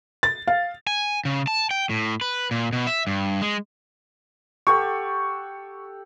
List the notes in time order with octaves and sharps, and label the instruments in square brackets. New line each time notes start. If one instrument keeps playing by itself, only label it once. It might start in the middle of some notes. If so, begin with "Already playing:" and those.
[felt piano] A6
F5
[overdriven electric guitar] G#5
C#3
A5
G5
A2
B4
A#2
B2
E5
G2
G#3
[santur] G4 A4 F#5 [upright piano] C#6